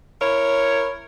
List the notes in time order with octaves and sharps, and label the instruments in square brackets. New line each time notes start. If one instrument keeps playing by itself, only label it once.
[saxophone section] E4 A#4 C#5